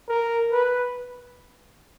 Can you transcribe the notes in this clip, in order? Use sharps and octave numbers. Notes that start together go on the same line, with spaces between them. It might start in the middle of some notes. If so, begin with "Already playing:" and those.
A#4
B4